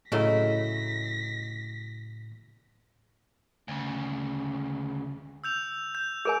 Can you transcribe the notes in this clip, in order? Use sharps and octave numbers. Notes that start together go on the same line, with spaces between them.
A2 C#3 F#3 A3 E4 D#5 A#6 B6
D2 C#3
E6 G6 F7
G6
G#4 A#4 G#5 G6 D7